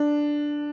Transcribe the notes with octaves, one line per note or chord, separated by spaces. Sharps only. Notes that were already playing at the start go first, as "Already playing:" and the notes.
Already playing: D4